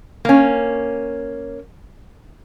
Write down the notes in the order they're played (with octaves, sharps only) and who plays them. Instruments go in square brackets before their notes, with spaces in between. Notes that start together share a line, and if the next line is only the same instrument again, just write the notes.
[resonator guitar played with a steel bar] A#3 C#4